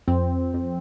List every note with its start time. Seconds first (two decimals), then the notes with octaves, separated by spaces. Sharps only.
0.08 F2 C4
0.54 F2